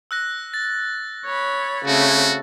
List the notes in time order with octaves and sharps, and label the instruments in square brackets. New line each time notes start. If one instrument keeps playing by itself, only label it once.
[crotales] E6 F#6 A#6
A6
[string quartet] C#5 B5
[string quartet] C#3 A3 C4 [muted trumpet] F#4